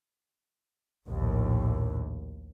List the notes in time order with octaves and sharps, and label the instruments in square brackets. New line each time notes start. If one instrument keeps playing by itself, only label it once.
[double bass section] A#1 D#2 A2